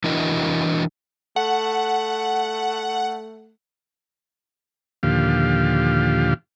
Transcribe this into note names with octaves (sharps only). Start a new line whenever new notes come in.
E3 D4 E4 F#4 A#4 D#5
A3 F#5
D#2 A#2 D3 F3 G4 F5